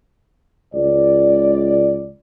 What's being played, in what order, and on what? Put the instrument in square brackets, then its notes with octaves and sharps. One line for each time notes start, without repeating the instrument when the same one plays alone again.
[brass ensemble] C#2 D5